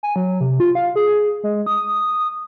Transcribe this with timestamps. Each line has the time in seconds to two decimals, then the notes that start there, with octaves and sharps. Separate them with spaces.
0.03 G#5
0.16 F#3
0.41 C3
0.60 F4
0.75 F5
0.96 G#4
1.44 G#3
1.66 D#6